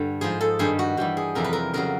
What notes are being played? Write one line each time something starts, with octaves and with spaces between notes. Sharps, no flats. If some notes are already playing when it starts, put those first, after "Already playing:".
Already playing: G2 D3
G#2 F3 G#4
A4
G2 D#3 G3 G#4
F#4
G2 E3 G3 G4
G#4
F2 C3 E3 G3 A#4
B4
A#4
F2 C#3 F#3 A#4